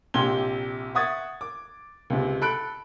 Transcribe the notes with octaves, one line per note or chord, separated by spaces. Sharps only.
A#1 C3 G4 C6 G#6 G7
E5 F#5 C#6 D#6 G#6 A6
D6
C#2 C3
A4 B5 F#6 D7